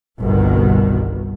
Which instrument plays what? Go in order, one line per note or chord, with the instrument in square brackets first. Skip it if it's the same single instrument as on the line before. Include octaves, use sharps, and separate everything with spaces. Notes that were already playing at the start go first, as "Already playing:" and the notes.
[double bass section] G1 C2 B2 D#3